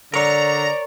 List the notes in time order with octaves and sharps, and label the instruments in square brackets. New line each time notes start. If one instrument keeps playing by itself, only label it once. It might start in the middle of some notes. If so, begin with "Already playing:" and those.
[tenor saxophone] D3 [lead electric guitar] A#4 C#5 [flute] D5 [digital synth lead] A#5